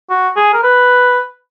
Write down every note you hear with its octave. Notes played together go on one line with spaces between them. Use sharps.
F#4
G#4
A#4
B4